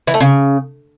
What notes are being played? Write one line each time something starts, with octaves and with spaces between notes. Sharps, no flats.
E3
A3
C#3